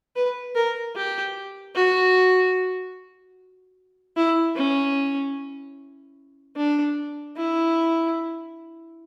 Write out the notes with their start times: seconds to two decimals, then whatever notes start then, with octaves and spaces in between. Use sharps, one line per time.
0.16 B4
0.55 A#4
0.96 G4
1.76 F#4
4.16 E4
4.56 C#4
6.56 D4
7.37 E4